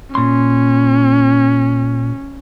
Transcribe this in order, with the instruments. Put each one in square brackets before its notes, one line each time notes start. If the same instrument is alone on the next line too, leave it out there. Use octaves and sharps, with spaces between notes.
[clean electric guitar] A#2 C6 [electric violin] C#4